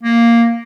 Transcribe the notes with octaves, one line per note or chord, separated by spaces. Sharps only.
A#3